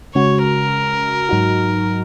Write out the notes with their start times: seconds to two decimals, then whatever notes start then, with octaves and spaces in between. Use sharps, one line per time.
0.15 C#3 G#3 C#4 F#4 C#5
0.43 A#4
1.29 G#2 F#3 D#4 F#4